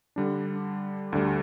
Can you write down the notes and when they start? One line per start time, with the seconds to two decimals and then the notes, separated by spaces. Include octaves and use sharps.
0.16 D3 G3 D4
1.12 D2 D3 G3